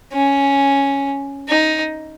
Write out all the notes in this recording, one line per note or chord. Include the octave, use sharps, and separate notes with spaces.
C#4
D#4